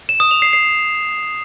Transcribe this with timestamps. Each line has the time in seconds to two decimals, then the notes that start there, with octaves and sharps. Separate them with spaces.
0.09 E7
0.20 D#6
0.31 F7
0.42 C7
0.53 C7